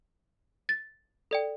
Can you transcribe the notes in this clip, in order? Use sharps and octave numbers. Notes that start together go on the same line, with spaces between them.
A6
A4 D5 G5